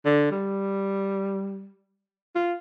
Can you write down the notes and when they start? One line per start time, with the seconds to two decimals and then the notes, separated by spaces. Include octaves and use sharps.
0.06 D3
0.31 G3
2.35 F4